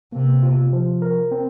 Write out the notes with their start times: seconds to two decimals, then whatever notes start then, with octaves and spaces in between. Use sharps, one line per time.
0.12 C3 A#3
0.43 F4
0.73 F3
1.02 A#4
1.31 C4